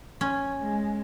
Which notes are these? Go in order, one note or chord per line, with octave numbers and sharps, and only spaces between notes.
C#4
G#3